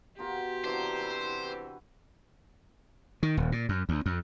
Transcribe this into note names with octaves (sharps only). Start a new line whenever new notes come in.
B2 F4 G4 A#4
C3 E3 D4 F#4 C5 A#5
E4 B4
D#3
D#1
A#2
F#2
D2
F2